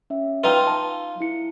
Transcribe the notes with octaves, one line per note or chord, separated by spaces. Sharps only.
C#4 E5
D#4 F4 B4 G5
F5 A5
E4 C#7